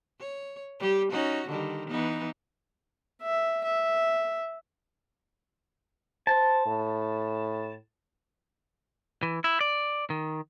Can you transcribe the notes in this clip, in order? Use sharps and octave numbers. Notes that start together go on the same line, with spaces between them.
C#5
G3 G4
C#4 D#4 F#4
D3 D#3 G3
E3 B3 D#4
E5
E5
C5 A5
A2
E3
E4
D5
D#3